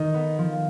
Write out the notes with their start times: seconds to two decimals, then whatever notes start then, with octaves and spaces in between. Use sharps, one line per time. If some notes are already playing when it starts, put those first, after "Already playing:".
Already playing: D#3 D#4
0.14 B3
0.39 F3